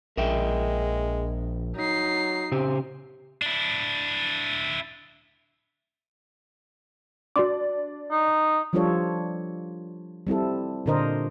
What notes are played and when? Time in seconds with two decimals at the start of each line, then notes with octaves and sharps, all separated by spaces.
0.17 A#1 G#3 A#4 E5 G5
1.76 F#3 D#4 C7
2.52 C#3 C4 G4
3.42 D4 E4
7.36 D4 F#4 D5 C6 D6
8.11 D#4
8.73 F3 G3 D4 F4 A4 C#5
10.27 G3 C4 E4 A4
10.86 A#2 D3 D4 A#4 C5 D#5